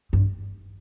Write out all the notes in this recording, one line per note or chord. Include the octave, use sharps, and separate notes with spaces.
G2